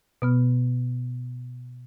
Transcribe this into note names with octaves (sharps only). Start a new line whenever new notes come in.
B2 B3 F6